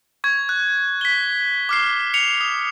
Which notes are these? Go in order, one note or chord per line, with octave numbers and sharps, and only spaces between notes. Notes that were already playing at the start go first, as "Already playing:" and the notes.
C#6 G#6
F#6
B6 G7
D6 F6 C7
C#7 F7
D#6